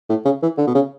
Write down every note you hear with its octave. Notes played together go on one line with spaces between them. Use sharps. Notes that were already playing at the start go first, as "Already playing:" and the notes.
A2
C#3
E3
D3
B2
C#3